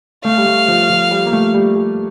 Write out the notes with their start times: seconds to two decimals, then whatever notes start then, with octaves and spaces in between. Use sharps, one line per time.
0.24 A3 F5
0.38 G3
0.46 A3
0.68 F3
0.89 F3
1.11 G3
1.26 A#3
1.32 A3
1.54 G3
1.76 G3